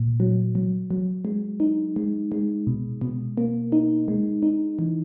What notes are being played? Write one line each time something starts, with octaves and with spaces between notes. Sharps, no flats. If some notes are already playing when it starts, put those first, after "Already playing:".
Already playing: A#2
F#3
F#3
F#3
G#3
D#4
G#3
G#3
B2
B2
A#3
D#4
G#3
D#4
E3